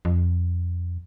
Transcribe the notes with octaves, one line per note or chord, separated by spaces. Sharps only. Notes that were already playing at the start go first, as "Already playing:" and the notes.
F2